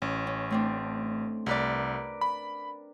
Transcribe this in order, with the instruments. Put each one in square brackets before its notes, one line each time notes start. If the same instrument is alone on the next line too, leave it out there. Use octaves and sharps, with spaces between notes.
[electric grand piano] A1 [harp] C#4
[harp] C#4
A3 C4 D4
[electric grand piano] C2 [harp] A#4 B4 D5
[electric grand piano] B5